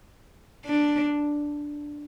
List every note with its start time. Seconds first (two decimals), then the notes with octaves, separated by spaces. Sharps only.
0.66 D4